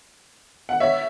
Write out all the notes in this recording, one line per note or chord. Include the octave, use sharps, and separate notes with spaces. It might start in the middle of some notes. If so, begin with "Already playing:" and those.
F#5
C#5 E5